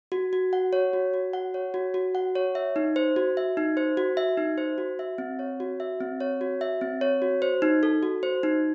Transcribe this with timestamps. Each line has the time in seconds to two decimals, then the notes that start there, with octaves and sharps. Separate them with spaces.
0.12 F#4
0.33 F#4
0.53 F#5
0.73 C#5
0.93 F#4
1.14 F#4
1.33 F#5
1.54 C#5
1.74 F#4
1.94 F#4
2.15 F#5
2.35 C#5
2.55 E5
2.76 D#4
2.96 C5
3.16 F#4
3.37 E5
3.57 D#4
3.77 C5
3.97 F#4
4.17 E5
4.38 D#4
4.58 C5
4.78 F#4
4.99 E5
5.18 C4
5.39 C#5
5.60 F#4
5.80 E5
6.00 C4
6.20 C#5
6.41 F#4
6.61 E5
6.81 C4
7.01 C#5
7.22 F#4
7.42 C5
7.62 D#4
7.83 A4
8.03 F#4
8.23 C5
8.43 D#4